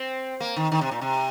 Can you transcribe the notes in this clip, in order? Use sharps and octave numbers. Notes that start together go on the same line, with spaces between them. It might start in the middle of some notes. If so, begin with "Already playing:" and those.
Already playing: C4
A#3
D#3
D#3
C3
A#2
C3